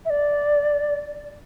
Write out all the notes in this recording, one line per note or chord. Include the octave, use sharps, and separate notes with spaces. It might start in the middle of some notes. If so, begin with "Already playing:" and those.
E5
D5